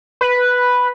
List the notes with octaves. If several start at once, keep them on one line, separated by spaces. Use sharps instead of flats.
B4